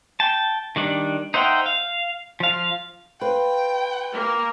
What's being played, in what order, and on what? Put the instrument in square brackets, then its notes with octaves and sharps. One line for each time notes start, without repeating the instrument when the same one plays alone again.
[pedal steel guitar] G5 A5
D#3 G3 D4
D#4 C5 E5 F#5 G5
F5
F3 F5
[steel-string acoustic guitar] F4 B4 [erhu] G5
[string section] A#3